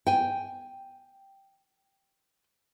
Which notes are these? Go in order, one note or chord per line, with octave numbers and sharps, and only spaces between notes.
G5 G#5